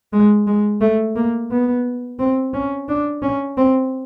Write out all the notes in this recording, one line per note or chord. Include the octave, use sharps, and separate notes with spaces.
G#3
G#3
A3
A#3
B3
C4
C#4
D4
C#4
C4